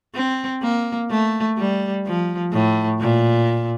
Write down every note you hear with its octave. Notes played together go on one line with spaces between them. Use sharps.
C4
A#3
A3
G3
F3
A2
A#2